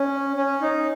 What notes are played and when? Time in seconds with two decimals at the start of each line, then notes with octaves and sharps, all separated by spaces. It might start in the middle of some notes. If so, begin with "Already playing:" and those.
Already playing: C#4
0.36 C#4
0.61 D#4